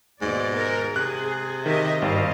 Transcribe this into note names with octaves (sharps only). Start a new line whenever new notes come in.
D#2 G#2 B2 D5
A#4
C3 G#4 F#6
D#3 G4 D#5 E5
G#1 G2 D#5 F5